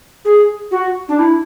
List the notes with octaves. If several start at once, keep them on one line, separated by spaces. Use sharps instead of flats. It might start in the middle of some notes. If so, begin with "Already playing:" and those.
G#4
F#4
D4
E4